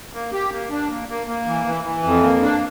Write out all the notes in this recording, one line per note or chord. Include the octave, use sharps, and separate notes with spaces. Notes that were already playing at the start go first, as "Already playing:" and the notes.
A#3
G4
A#3
D4
A#3
A#3
A#3
E3
E3
E3
F2
A#3
D4